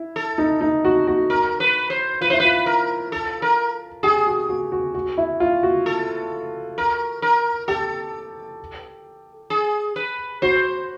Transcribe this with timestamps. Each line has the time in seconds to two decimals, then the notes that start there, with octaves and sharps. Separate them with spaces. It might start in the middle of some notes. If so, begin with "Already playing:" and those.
Already playing: E4
0.16 A4
0.38 D#4
0.61 D#4
0.85 F#4
1.07 F#4
1.30 A#4
1.60 B4
1.90 C5
2.21 F4 B4
2.30 E4 C5
2.40 F4 B4
2.66 A#4
3.12 A4
3.42 A#4
4.03 G4 G#4
4.27 F#4
4.49 F#4
4.72 F#4
4.94 F#4
5.18 E4
5.40 F4
5.63 F#4
5.86 A4
6.78 A#4
7.22 A#4
7.68 G4 A4
9.50 G#4
9.96 B4
10.42 F#4 C5